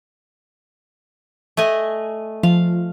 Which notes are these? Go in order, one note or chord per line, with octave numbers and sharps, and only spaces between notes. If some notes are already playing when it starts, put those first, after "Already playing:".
A3 D#5 G#5
F3 F5